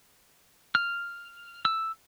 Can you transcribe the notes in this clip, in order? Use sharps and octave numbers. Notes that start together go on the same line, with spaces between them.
F6
E6